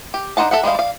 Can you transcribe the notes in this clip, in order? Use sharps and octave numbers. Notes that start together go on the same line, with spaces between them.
G4
D4 D#4 C5 F#5 A5
A4 E5 F#5
G3 G#3 B3 D#5 F5
D5 F5